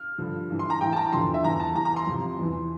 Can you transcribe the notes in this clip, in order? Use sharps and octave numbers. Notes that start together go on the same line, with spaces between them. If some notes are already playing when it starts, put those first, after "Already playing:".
Already playing: F6
G2 D3 F3
G2 E3
C6
A#5
A2 E3 G5
A5
A#5
E2 D3 F3 C6
E5
E2 E3 A#5
A5
E2 E3 A#5
A#5
C6
F2 C3 F3
E2 E3